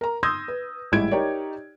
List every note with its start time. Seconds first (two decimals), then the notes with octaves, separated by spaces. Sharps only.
0.01 A#4 A#5
0.23 C6 D#6 E6 G6 G#6 A#6
0.48 B4
0.92 A1 G3 G#3 E4 G#6 D7
1.11 D#4 G4 A#4 C#5 D5